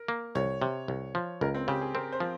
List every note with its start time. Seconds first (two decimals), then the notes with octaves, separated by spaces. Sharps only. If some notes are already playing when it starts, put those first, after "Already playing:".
Already playing: A#4
0.08 A#3
0.35 C2 C#5
0.62 C3
0.88 C2
1.15 F3
1.41 C#2 A#4
1.55 C4
1.68 C#3 G4
1.81 G#4
1.95 C4 A#4
2.12 C5
2.20 F3